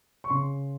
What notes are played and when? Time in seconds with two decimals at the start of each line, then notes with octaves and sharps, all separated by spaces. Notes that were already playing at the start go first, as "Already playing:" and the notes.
0.24 C#6
0.30 C#3 C6